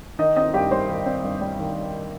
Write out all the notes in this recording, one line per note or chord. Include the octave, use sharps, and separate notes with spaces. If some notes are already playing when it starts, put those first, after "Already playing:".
D#3 D#4 D#5
C4 D#4 D#5
G2 G4 G5
G3 C5 C6
D#3
C4
G2
G3
D#3